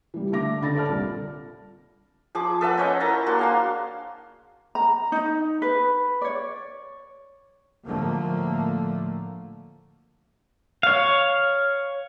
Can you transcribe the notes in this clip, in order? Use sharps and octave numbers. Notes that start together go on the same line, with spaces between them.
E3 G3
D3 A3 E5 D6 A#6
D3 B5 A6 A#6
A4 D5 A5 F6
C2 A#2
F3 G#4 D6
A4 B4 E5 F#5
C#4 C5 C#5 D#5
E4 A#4 A5 A#5
A#3 D4 F#4 C6
G#4 F5 C6
A#5
D#4
B4
C#5 D5
A2 D3 F3 A3 A#3
C#5 F5